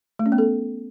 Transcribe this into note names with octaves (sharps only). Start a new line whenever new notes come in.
A3
C#4
B3
A4